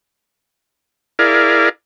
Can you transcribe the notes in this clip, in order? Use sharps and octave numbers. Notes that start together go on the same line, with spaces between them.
E4 G#4 A#4 D5 F5